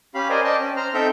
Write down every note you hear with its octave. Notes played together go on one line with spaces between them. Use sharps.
C#4 G4 F5 B5
A#4 C5 D5 D#5 G#5
D5 D#5 G5 A5
C#4
C5 A#5 F6
C4 D#4 A4 E5 G5 G6